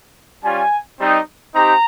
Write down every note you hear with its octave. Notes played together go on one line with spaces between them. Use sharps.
G3 C#4 F4 G#5
G3 C4 D#4 G4
C4 D#4 G4 A#5